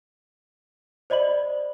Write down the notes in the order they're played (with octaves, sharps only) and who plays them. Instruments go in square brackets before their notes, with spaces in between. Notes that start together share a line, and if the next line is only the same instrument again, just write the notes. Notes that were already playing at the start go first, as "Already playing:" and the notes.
[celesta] C5 D5 D#5 B5 F#7